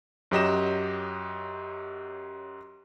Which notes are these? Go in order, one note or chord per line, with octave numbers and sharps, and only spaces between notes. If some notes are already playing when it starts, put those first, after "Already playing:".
F#2 F#3 G4 D#5 A#6 E7